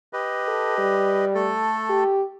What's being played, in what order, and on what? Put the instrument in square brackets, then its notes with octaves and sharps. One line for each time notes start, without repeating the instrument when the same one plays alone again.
[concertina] G4 B4 D#5
[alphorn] A4
G3
[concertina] A3 A4
[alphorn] G4